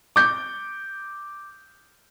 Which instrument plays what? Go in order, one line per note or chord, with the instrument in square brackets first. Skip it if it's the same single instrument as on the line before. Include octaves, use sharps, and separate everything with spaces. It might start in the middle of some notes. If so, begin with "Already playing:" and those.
[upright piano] D6 G6